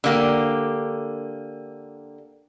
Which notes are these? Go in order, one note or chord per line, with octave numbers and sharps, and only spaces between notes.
D3 A#3 G4